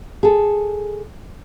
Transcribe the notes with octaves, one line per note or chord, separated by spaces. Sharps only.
G#4 A4